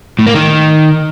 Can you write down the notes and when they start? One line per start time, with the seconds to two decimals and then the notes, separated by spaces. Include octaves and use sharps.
0.19 A2
0.27 A#3
0.35 D#3